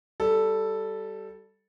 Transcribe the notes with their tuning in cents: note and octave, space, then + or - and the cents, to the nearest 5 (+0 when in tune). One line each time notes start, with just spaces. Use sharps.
G3 -10 A4 +0